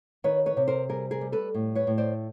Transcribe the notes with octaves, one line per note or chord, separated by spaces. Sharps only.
D#3 B4 C#5
B4 C#5
C3
A#4 C5
G3 G#4 A#4
G#4 A#4
G3
A4 B4
A2
B4 C#5
A2
C5 D5